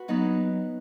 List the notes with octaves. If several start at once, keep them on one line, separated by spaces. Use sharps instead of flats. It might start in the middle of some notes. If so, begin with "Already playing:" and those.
Already playing: F#4 B4
F#3 B3 D#4